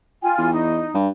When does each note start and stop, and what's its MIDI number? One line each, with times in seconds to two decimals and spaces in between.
0.22 0.49 65
0.22 0.49 79
0.22 0.49 80
0.38 0.86 40
0.52 0.94 63
0.94 1.08 43